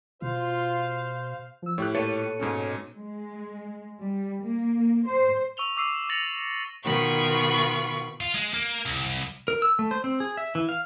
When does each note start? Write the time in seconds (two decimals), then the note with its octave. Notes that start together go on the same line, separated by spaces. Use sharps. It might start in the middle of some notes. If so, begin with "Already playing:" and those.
0.22 B2 F4 C5 F5
1.62 F3 E6
1.78 A2 G4 C#5 F#6
1.95 A#2 A4 C#5 C#7 D#7
2.40 G#2 B2 C#4
2.97 G#3
4.01 G3
4.44 A#3
5.07 C5
5.57 C#6 E6 F7 G7
5.77 D6 E6 C7 D#7
6.09 D6 A6 A#6 C#7 F7 F#7
6.83 B2 D#3 F4 B5 C#6
8.20 F4
8.34 G#3
8.54 A#3
8.86 C2
9.48 A#4
9.62 E6
9.79 A3
9.91 C5
10.04 C4
10.20 G#4
10.37 E5
10.55 E3
10.69 F5